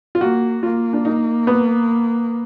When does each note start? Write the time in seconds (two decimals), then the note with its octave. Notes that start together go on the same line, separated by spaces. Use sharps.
0.15 F4
0.20 A#3 F#4
0.63 A#3 F4
0.93 D4
1.05 D#4
1.47 B3